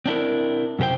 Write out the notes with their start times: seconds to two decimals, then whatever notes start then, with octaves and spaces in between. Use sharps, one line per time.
0.06 C4 D4 E4 A#4
0.79 F#2 C3 G4 C5 G5